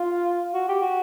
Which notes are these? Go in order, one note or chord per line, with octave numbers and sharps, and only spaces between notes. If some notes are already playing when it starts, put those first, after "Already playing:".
Already playing: F4
F#4
G4
F#4